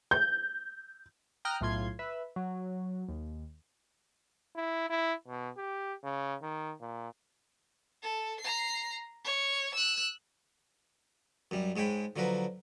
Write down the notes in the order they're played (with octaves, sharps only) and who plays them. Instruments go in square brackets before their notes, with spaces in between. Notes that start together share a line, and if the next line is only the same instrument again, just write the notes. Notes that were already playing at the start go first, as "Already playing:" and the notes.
[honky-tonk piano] G6
[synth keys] G5 A#5 D#6 F6 F#6
B1 A2 F4 C6 G#6
B4 E5
F#3
D#2
[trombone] E4
E4
B2
G4
C#3
D#3
A#2
[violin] A4
A#5 C7
C#5
E6 F#6
[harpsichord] F#2 G3
G#2 G#3 C#5 G5 B5
D3 F3 F#3 A#4 B4